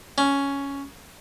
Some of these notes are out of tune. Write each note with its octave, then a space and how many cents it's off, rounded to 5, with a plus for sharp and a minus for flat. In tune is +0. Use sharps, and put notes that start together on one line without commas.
C#4 +5